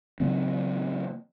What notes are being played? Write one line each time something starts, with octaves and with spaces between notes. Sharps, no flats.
C#3 F#3 A#3 C4